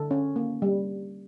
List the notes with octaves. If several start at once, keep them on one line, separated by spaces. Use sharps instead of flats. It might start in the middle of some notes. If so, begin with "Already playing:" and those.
Already playing: D3 A4
C#4
A#3
G3